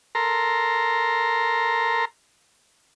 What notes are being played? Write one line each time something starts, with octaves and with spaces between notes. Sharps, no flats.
A4 A#4 A#5 C6